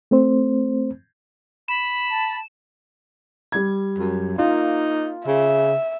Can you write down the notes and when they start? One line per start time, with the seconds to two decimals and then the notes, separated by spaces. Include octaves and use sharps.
0.11 A3 C4 C5
1.68 B5 E7
2.09 A5
3.52 G3 G#6
3.98 F#2
4.38 A#3 D#4 F4
5.27 C#3 E5